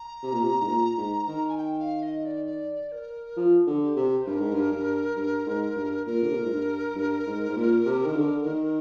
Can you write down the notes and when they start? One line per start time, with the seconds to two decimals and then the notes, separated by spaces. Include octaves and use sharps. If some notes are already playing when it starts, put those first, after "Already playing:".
Already playing: A#5
0.23 C3
0.32 A#2
0.42 C3
0.61 G#2
0.67 A#2
0.97 G#2
1.27 D#3
1.48 G#5
1.57 G5
1.79 F5
2.02 D#5
2.25 D5
2.46 D5
2.92 A#4
3.36 F3
3.67 D3
3.82 G4
3.96 C3
4.21 C5
4.26 G2 A#4
4.39 G#2
4.53 G2
4.71 G2
5.16 G2
5.46 G#2
5.75 G2
6.06 A#2 A#4
6.22 D3
6.29 C3
6.36 A#2
6.43 G#2
6.51 G2
6.95 G2
7.26 G#2
7.49 G#2
7.56 A#2
7.85 C3
8.06 D#3
8.15 D3
8.45 D#3